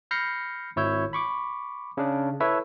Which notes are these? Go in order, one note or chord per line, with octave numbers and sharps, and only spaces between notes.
B5 F6 G6 A#6 C7 C#7
G#1 E4 C#5 E6 G6
B5 C#6 D6
C#3 D4
E4 A4 B4 C#5 E5